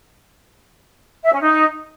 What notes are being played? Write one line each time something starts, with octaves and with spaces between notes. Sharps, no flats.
E5
C#4
D#4